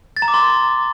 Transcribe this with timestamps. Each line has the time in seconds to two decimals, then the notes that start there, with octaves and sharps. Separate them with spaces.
0.17 A6
0.22 A#5
0.28 D6
0.34 C6